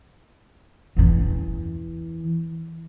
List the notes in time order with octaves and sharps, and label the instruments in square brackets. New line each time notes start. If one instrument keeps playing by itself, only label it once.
[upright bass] E2 E3